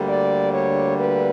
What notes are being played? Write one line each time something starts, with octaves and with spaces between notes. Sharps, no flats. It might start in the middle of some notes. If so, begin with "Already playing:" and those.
Already playing: D2 D3 G3 A#3
D5
C#5
B4